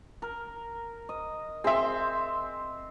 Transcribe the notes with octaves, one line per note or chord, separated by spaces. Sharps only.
A#4
D#5
C4 G#4 E5 C6